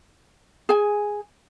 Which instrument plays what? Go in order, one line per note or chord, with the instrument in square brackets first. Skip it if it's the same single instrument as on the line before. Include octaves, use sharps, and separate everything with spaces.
[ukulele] G#4 G#5